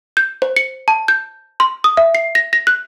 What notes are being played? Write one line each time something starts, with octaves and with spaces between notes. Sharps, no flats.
G6
C5
C#7
A5
G6
C6
D#6
E5
C7
A#6
A#6
F#6